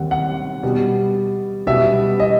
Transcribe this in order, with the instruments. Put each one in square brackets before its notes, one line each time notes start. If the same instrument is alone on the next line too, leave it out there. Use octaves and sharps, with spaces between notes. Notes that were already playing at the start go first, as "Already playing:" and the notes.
Already playing: [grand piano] D#2 D#3 G3 C4 F#5
F#5
B2 G3 B3
B2 G3 B3 E5
D#5